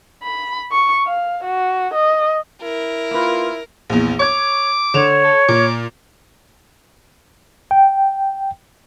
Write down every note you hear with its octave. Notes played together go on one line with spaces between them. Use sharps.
B5
C#6
F5
F#4
D#5
E4 A#4
A#3 F4 B4
A#1 E2
C#5 D6 G#6
D3 C#5 E7 F7
A4
A#2 D6
G5